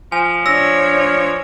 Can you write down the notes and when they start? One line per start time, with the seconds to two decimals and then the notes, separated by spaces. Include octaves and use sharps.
0.12 F3 G#5
0.46 D4 C#5 E6 A#6